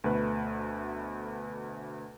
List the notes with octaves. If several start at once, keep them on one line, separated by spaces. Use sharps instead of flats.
D2 B2 A3 B4